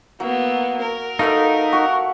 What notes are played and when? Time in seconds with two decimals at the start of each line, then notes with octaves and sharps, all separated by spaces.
0.20 F#3 A#3 B3
0.82 A#4
1.19 A3 D#4 B4 E5 F5
1.73 F#4 C#6